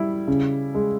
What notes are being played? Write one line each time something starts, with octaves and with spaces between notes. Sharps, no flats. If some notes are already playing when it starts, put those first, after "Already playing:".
Already playing: G3 E4
C#3
G#3